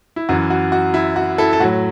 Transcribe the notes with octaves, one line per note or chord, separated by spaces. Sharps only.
E4
F#2 E3 F#4
F#4
F#4
E4
F#4
E4 A4
A4
A2 F#3 F#4